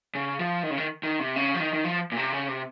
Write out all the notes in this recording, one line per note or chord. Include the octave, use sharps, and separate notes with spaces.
C#3
F3
D#3
C#3
D#3
D#3
C3
C#3
F3
D#3
D#3
F3
A#2
C3
C#3
C3